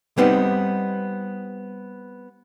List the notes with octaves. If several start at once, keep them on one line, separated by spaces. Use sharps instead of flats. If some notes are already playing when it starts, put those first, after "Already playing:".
G3 B3 C4 D#4 B4